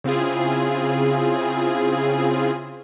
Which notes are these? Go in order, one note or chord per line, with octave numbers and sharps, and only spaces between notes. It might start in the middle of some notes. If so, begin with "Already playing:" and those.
C#3 C4 E4 F4 G#4